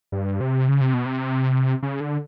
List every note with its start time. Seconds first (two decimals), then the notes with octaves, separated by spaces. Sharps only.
0.12 G2
0.40 C3
0.69 C#3
0.81 C3
0.94 B2
1.06 C3
1.83 C#3
2.00 D3